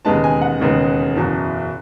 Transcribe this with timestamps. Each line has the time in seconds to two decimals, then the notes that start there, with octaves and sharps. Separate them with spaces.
0.05 E1 D#2 C#3 G#3 B3 A5
0.24 G#5
0.41 F#5
0.60 E1 D#2 C#3 G#3 B3
1.16 F#1 E2 B2